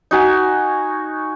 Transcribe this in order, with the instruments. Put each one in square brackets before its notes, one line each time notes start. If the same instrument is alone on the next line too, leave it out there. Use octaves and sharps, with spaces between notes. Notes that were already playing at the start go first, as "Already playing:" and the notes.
[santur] D#4 F#4 G#5